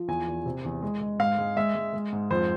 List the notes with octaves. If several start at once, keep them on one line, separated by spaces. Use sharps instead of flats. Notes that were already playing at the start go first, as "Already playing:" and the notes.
Already playing: F3
E2 G#5
E2
C3
E2
G#3
G#3
G#2 F5
G#3
G#3 E5
G#3
G#3
G#2
F2 C5